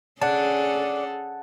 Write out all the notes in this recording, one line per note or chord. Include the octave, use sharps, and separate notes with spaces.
C#4 D4 G#4 A4 F#5 A5